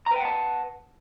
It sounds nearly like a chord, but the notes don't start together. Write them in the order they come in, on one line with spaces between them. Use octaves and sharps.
A#5 B4 G5 F#5 A5